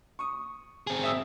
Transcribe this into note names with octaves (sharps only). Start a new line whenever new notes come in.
C#6 D#6
C4 G#4
E5 D#6 E6